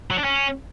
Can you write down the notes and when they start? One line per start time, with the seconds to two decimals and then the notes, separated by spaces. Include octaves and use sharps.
0.11 F#3
0.17 D4
0.24 C#4